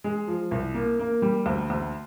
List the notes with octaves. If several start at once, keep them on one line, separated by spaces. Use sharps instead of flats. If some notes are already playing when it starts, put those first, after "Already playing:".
G#3
F3
C2
A#3
A#3
G3
D2
D2